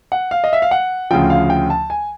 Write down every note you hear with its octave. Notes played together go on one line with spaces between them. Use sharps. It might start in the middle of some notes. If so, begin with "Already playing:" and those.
F#5
F5
D#5
E5
F5
F#5
D2 C#3 F3 G5
F5
G5
A5
G#5